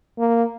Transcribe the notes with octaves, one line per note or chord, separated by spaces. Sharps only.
A#3